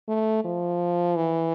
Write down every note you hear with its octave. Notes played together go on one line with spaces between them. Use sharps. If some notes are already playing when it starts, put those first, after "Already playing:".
A3
F3
E3